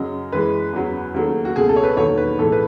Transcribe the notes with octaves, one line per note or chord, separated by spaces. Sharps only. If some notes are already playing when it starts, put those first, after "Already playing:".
Already playing: F#2 C#3 F#3 D#5
F#2 E3 G#3 B4
E2 C#3 F#3
D#2 C#3 F#3 A3
F#4
C#2 B2 A3 G#4
A4
C#5
B4
E1 D#2 D#3 F#3 A3 C#5
B4
B1 A2 E3 G#3 A4
B4